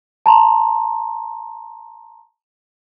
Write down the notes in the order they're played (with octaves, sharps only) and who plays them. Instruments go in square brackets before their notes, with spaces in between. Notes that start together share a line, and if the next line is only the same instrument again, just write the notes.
[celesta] A5 A#5 C6